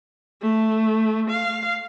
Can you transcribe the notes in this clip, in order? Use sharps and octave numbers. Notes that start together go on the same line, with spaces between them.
A3
F5